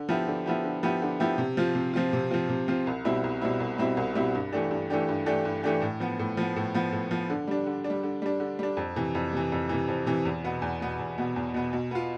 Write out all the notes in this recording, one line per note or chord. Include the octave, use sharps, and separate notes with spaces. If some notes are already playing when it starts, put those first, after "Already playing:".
Already playing: D3
F3 B3 E4 G4
D3
F3 B3 E4 G4
D3
F3 B3 E4 G4
D3
F3 B3 E4 G4
C3
F3 C4 F4
C3
F3 C4 F4
C3
F3 C4 F4
C3
F3 C4 F4
C2
B2 G3 C4 E4
C2
B2 G3 C4 E4
C2
B2 G3 C4 E4
C2
B2 G3 C4 E4
G2
E3 A3 D4 G4
G2
E3 A3 D4 G4
G2
E3 A3 D4 G4
G2
E3 A3 D4 G4
A2
F3 B3
A2
F3 B3
A2
F3 B3
A2
F3 B3
D3
G3 D4
D3
D4
G3
D3
G3 D4
D3
G3 D4
F2
C3 E3
F2
C3 E3
F2
C3 E3
F2
C3 E3
E2
B2 B3
E2
B2 B3
E2
B2 B3
E2
B2 B3
B2
B3 F4